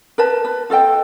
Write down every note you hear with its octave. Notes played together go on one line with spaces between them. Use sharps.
A#4 B4 A5
B4
F4 A4 D#5 G5